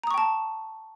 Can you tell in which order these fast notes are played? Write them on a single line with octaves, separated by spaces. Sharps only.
A#5 D#6 C#6 G5 A5